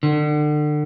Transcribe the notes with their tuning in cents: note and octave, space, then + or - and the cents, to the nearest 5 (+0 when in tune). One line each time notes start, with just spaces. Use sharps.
D3 +35